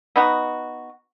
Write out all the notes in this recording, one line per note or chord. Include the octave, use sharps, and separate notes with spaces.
B3 D#4 F#4